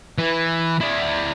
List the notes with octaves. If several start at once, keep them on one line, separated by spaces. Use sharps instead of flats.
E3
E4 D5